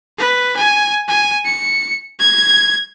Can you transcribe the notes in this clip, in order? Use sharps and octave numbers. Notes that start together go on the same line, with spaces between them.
B4
G#5
G#5
C#7
G#6